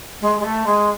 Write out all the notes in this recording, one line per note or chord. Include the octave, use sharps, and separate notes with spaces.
G#3
G#3
A3
G#3